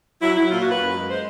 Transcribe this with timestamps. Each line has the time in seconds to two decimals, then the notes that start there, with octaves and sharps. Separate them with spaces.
0.21 F#3 E4
0.35 F#3 E4
0.50 A#2 F4
0.60 F#4
0.65 A#3 B4
0.79 F#2
0.93 G#3
1.09 G#3 C5